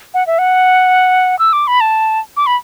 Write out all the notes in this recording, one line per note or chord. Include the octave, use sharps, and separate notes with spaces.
F#5
E5
F#5
E6
D6
B5
A5
D6
B5